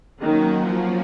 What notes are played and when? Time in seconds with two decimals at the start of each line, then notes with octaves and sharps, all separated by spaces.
0.19 D#3 F#3 A#3 C#4 F#4 A#4
0.66 F3